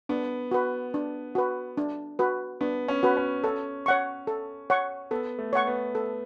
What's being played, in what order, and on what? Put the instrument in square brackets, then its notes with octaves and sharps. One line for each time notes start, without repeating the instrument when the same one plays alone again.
[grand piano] B3 [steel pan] D4
[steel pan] F#4 B4
D4
F#4 B4
D4
F#4 B4
[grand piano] B3 [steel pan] D4
[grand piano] C#4
[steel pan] F#4 B4
[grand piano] C#4
[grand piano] C#4 [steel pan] A4
[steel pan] C#5 F#5 C#6
A4
C#5 F#5 C#6
[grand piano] B3 [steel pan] A4
[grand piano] A3
[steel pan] C#5 F#5 C#6
[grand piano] B3
[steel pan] A4